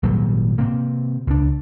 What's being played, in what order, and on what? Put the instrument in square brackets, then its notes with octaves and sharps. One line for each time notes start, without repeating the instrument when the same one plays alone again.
[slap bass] G#1 A#2 F#3 G3
C3 A#3 C4
C#2 D4